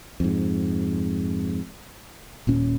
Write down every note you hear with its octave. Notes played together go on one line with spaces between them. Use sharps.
F2 G#2
D#1 A#2 C#4